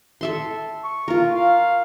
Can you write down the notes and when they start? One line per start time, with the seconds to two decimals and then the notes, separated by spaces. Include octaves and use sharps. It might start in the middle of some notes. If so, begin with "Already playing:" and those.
0.21 A4 E5 C6
0.84 C#6
1.08 F4 A#4
1.35 F5